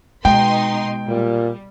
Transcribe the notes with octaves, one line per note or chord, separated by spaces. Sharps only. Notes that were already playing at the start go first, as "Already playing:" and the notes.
B2 G#3 D#4 G5 C6
A#2 G3